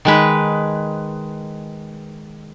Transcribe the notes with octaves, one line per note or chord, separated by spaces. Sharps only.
D#3 G#3 B4